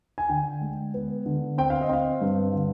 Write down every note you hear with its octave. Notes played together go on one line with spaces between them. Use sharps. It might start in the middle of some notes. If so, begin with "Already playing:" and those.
G#5
D3 G5
G#3
B3
D3
C4 G5
F5
D#5
C4 F5
G2
D3